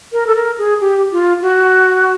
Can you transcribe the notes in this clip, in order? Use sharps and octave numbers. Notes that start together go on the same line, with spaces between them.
A#4
A4
A#4
G#4
G4
F4
F#4